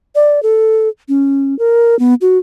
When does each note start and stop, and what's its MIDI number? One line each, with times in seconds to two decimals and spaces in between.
0.15 0.42 74
0.43 0.89 69
1.09 1.57 61
1.59 1.97 70
1.99 2.14 59
2.21 2.38 66